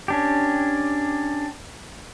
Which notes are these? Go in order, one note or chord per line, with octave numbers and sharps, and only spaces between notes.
C#4 D4 G4